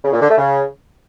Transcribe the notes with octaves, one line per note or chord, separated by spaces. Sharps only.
C#3
A#2
D3
A3
C#3